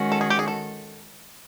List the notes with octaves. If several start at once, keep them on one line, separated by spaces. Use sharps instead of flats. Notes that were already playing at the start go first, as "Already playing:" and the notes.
Already playing: D#3 G#3 C#4 F#4
A4
G#4
G4
G#4
A4